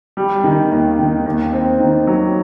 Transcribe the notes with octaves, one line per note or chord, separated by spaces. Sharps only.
G3
D#3
D#2
D#3
D#2
C4
D#3
F#3